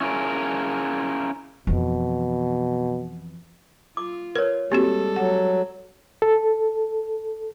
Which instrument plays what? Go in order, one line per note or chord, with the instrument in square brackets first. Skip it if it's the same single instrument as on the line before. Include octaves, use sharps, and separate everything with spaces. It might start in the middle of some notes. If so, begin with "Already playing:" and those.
[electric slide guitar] C#4 E4 F4 G#4 A#4
[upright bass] F2 E3 [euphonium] B2
[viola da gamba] F4 [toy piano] D6
[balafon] A#4 [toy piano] B4 C#5
[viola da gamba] G3 G#3 A4 [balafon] A#3 C4 F#4 [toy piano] G4
[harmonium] F#3 [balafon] F#5
[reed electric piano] A4